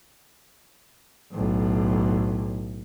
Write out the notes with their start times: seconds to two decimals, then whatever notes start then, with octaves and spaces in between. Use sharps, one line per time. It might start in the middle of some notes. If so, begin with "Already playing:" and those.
1.32 B1 A2